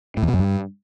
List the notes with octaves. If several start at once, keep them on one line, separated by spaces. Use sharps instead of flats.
A2
E2
B2
F#2
G2